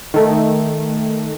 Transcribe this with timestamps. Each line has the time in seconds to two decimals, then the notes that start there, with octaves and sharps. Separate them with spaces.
0.14 D#3 A3